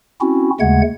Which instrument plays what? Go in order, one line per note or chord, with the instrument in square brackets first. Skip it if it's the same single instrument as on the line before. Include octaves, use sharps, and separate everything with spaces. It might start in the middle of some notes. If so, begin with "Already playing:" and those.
[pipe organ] C4 C#4 E4 F#4
D#2 C#3 G#3 A3 F#5 G#6